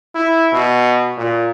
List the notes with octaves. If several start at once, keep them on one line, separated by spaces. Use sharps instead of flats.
E4
B2
A#2